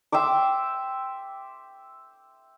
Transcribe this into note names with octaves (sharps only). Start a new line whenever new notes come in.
E5 G5 C6 D6